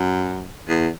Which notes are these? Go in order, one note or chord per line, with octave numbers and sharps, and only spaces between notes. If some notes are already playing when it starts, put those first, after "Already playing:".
Already playing: F#2
E2